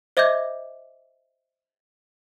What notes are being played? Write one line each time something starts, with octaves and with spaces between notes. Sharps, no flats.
C5 D#5 E5 D6 G6 G#6